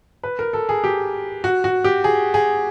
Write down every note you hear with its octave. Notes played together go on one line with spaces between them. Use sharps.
B4
A#4
A4
G#4
G4
F#4
F#4
G4
G#4
G#4